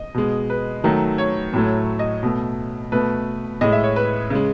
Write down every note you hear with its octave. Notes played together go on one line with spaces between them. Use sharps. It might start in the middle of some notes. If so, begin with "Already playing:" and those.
Already playing: D#5
B2 G#3
B4
D#3 F#3 A3
C#5
A2 F#3 A3
D#5
B2 A3
B2 A3 B4
A2 G#3 D#5
E5
C#5
B4
C#3 G#3